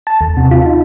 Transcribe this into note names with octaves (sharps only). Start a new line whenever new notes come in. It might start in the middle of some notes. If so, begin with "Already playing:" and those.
A5
D#2
C3
F4
D#4